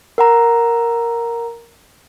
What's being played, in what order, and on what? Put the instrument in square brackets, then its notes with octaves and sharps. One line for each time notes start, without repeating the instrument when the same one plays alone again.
[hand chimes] A#4 F#5 A#5